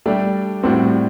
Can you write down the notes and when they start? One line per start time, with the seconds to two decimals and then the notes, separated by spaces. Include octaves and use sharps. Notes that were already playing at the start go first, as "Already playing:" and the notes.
0.06 G3 A3 D4 G4
0.63 A2 G3 C4 D4 F#4